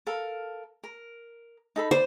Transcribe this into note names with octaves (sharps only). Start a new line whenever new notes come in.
A4 A#4 F5
A#4
D#4 A4 B5
C5 D5